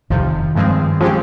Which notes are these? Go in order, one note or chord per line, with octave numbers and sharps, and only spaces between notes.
F2 C3 D#3 F3
G2 F3 G#3 C4
C#3 F3 G#3 C4 G4